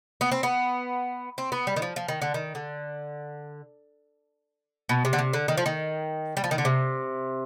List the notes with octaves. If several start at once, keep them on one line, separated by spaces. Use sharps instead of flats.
B3
C4
B3
C4
B3
G3
D#3
F3
F3
D#3
D3
D#3
D3
B2
C3
D3
C3
D3
D#3
F3
D#3
G3
F3
D#3
D3
C3